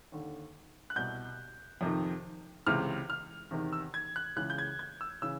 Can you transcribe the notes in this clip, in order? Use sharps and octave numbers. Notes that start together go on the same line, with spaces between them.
D#2 D3
F#6
C2 B2 G6
F2 C3 D#3
C#2 C3 E3 F6
F6
E2 C3 D#3
E6
G#6
F#6
C#2 C#3 E3 F#6
G6
G#6
G#6
E6
C#3 E3 E6